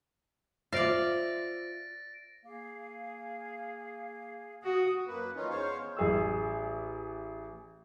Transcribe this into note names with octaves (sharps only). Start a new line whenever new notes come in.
F4 C5 D5 E5 F5 A6 A#6 D7
A#3 G#4 F5
F#4 D#6
F#2 A#3 B4
E3 C#4 D#4 F4
E2 G#3 C5 C#5 F5
A1 G#4 E6